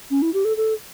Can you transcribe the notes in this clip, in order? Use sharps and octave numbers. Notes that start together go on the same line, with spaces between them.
C#4
E4
G4
A4
A4